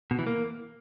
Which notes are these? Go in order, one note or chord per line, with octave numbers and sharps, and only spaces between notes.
B2
E3
A#3